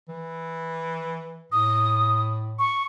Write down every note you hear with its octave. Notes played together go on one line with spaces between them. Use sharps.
E3
A2 D#6
C#6